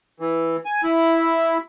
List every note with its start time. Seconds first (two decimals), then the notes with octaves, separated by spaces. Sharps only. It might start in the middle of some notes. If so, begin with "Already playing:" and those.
0.20 E3
0.65 G#5
0.83 E4